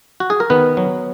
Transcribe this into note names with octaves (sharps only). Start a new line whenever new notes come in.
F#4
G#4
A#4
D#3 B3 B4
F#3